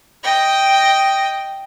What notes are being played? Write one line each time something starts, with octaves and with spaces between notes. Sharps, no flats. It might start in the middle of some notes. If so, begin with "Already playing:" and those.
D#5 G5